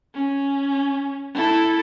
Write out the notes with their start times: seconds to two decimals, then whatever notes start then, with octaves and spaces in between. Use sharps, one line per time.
0.15 C#4
1.34 E4 A4